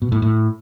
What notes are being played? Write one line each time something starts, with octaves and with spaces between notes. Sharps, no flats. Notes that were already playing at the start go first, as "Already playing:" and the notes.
B2
A2
A2